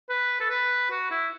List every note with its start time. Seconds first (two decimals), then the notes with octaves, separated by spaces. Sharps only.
0.10 B4
0.40 A4
0.50 B4
0.91 F#4
1.11 E4